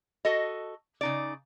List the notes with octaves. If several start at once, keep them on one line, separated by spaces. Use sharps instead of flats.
F#4 A4 D#5
C#3 D#4 D5